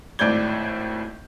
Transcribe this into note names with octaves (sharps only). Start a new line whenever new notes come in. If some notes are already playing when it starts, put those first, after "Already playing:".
G#1 A2 D5 G6 G#6 G7